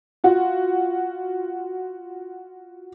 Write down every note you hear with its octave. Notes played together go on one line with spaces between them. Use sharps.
F4 F#4